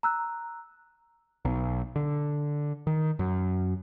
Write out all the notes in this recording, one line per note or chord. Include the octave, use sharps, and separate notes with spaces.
A#5 E6 F#6
B1
D3
D#3
F#2